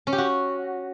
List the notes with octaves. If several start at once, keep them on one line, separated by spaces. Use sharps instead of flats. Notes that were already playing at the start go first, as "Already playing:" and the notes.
C#4
G4
F#4